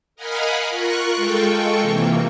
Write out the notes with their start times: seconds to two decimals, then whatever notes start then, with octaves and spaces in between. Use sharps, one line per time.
0.16 A#4 D#5 F5 F#5 G#5 B5
0.70 F4 A#4 C#6 F#6
1.15 G#3 F4 A4 G5 C#6
1.81 C3 E3 A#3